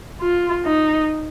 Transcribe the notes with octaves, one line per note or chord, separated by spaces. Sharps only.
F4
D#4